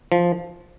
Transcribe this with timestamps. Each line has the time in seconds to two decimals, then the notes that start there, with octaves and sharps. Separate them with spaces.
0.12 F3